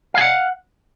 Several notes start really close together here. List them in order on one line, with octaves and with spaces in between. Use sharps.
F5 G#5 F#5